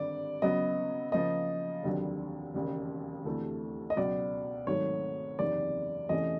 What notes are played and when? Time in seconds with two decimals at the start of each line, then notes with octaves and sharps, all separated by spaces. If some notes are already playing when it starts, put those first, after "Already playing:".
Already playing: G#1 G2 D3 D5
0.42 C#3 F#3 B3 D#5
1.12 C#3 F3 A#3 D#5
1.83 F1 D#2 D3 F#3
2.54 E1 D#2 C#3
3.25 D2 C3 E3 A3
3.90 D#5
3.96 C#2 B2 F#3 B3 D5
4.67 G#1 G#2 D#3 F#3 A3 C#5
5.39 F#1 E2 C3 D#3 D5
6.09 E2 C3 E3 A3 C#4 D#5